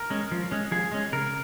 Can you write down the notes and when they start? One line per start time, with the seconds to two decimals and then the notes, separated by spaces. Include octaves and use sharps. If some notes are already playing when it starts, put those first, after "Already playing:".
Already playing: A#4
0.10 G#3 C#4
0.32 F3
0.51 G#3 C#4
0.72 F3 G#4
0.92 G#3 C#4
1.12 C#3 A#4